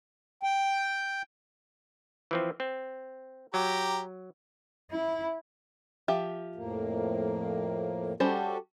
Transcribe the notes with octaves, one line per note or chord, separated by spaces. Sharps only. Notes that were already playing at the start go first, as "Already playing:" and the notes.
G5
E3 F3 C4
C4
F#3 G4 A#5
E4
F3 G4 E5
F2 A2 A#3
G3 C#4 F#4 G4 A4 C5